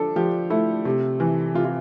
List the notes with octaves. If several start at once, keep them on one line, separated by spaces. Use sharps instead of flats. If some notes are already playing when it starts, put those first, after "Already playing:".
Already playing: F3 D4 A4
F3 G4
A3 E4
C3
E3
C3 F4
F4